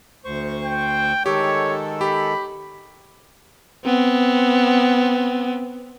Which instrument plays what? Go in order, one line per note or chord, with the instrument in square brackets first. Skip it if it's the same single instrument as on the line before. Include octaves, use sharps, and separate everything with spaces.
[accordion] D2 C5 C#6
[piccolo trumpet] G5
[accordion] D#3 G#3 A4 [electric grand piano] G4 [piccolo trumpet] C#5
[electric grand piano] G4 [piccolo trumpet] B5
[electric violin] B3 C4